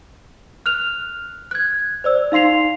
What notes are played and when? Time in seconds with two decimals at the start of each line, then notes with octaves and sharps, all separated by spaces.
0.66 F6 F#6 F7
1.51 F#6 G#6
2.04 C5 D5 E6
2.32 D#4 F5 C6 C7 F7